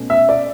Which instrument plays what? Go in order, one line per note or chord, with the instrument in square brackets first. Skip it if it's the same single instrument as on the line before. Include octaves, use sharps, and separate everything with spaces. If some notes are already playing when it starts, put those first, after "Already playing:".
Already playing: [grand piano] B2 A3 C#4
[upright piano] E5
D5